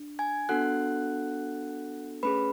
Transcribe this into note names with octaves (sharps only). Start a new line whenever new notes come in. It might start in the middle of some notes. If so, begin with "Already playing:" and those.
Already playing: D4
G#5 G#6
B3 D4 F#4 A4 F#5 F#6
A3 C#4 G#4 B4 B5